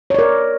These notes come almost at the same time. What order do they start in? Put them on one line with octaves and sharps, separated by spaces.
C#5 D5 A#4